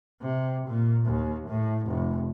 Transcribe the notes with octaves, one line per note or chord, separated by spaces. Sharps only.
C3
A#2
D#2
A2
F1